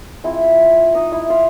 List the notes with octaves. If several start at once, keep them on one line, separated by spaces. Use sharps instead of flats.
F3 G#3 C4 E4 E5
D#4 D#5
E4 E5
F4 F5